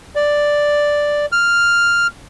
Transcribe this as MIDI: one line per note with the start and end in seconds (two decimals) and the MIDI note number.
0.15 1.26 74
1.32 2.07 89